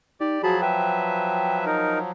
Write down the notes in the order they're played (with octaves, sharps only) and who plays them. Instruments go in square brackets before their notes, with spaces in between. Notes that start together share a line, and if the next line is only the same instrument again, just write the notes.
[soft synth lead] D#4 [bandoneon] G4 D5
[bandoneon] F3 F#3 [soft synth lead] F#4 [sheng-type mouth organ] G#4 A5 B5
[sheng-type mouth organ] B4 E5 [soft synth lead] G5
[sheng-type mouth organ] D#4 A#4